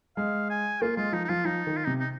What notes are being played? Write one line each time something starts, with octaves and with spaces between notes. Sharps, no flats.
G#3 F5
G#5
A#3 F4
G#3 F4
F3 D#4
D#4
F3 F4
F3 D#4
D#3
F4
C3 D#4
D#4